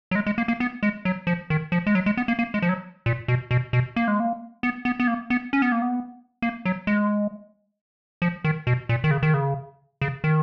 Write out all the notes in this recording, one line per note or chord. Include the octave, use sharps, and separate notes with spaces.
F#3
G#3
G#3
A#3
A#3
B3
G#3
F#3
F3
D#3
F3
G#3
F#3
G#3
B3
A#3
A#3
G#3
F3
F#3
A#2
B2
B2
B2
A#3
G#3
A#3
B3
B3
B3
A#3
B3
C#4
B3
A#3
B3
A#3
F#3
G#3
F3
D#3
B2
A#2
D#3
C#3
D#3
C#3
C#3
D#3